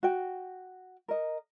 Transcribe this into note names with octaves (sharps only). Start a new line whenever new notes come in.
F#4 G5
A#4 D#5